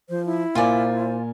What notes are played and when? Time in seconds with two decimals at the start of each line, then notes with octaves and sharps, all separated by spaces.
0.09 F3 C5
0.26 E4
0.55 A#2 F4 A#4 C5 D5 G#5